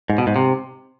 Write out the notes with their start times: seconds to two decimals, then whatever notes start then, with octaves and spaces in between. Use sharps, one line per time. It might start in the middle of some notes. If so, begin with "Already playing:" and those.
0.10 G#2
0.18 B2
0.27 G#2
0.36 C3